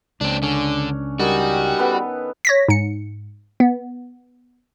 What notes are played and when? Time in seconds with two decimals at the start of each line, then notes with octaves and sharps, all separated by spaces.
0.21 C#2 C4 D4
0.42 D3 C#4 D4
1.19 D#3 G3 F#4 G#4
1.78 B3 A4 B4
2.45 C#5 A#6 B6
2.69 G#2 C#7
3.60 B3